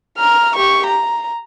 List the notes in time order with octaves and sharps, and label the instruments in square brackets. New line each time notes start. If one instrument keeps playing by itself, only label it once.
[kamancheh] A#5 F6
G4 C#6
A#5